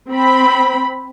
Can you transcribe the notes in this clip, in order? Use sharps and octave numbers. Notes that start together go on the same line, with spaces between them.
C4 B5